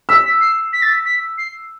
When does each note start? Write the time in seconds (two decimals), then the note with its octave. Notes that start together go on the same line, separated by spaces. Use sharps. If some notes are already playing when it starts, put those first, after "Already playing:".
0.09 E6 B6
0.25 B6
0.41 C7
0.73 B6
0.82 A6
0.90 B6
1.05 B6
1.38 C7